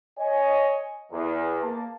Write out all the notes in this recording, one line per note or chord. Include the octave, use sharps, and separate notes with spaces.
C#5 D#5 G#5
E2
A#3 A5